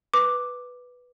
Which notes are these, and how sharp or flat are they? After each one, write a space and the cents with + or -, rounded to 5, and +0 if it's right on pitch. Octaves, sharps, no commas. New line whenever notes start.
B4 +0 D6 +5